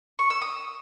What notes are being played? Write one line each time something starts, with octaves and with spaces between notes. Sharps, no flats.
C#6
E6
D#6